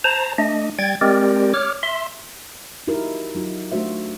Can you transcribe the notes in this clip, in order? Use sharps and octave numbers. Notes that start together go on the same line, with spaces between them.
C5 A5 A#5
A3 D4 D#5
G3 G5 G#6 A6
G#3 C4 G4 A#4 D5
C#5 D6 F6
E5 C6
D#4 E4 F#4 G4 A#4
F#3 D#4 F4 F#4
A3 D4 F#4 C5 E5